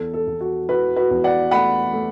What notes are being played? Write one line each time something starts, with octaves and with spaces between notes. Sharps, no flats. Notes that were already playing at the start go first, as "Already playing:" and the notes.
Already playing: E2 A4
A4
E2
F#4
E3 F#4 B4
F#4 B4
E2
D5 F#5
A3 F#5 B5
A3